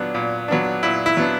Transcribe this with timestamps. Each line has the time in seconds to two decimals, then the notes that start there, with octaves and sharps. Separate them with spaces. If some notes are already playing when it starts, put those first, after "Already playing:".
Already playing: A#2 F#3 B3 D4
0.14 A#2
0.48 F#3 B3 D4
0.83 A#2 E4
1.06 E4
1.17 F#3 B3 D4